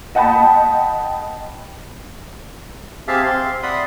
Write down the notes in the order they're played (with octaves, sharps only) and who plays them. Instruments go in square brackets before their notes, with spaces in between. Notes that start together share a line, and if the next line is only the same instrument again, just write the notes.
[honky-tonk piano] D#5 F#5 G5 A5 B5
[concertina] C4 G4 G#4 E5 F5 A5
C4 F5 C6
D5 E5 F#5 B5 C6 D#6